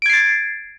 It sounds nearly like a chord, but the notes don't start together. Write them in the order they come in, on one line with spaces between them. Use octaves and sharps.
D7 G#6 C7 A6